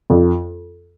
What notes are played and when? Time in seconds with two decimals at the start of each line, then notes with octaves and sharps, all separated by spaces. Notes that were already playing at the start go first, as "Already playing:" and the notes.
0.10 F2